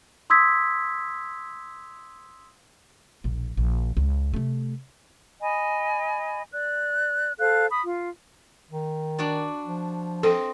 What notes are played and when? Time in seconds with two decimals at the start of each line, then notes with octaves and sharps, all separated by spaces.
0.30 C6 D#6 E6 G#6 B6
3.24 E1 A#1
3.57 A#1
3.97 C#2
4.34 C3 A3
5.41 D#5 G#5 B5
6.52 D5 F#6
7.39 A4 C5 F5 F#6
7.70 B5 D#6
7.85 F4
8.71 D#3
9.18 D4 F#4 D5
9.65 F3
10.23 C4 A4 D#5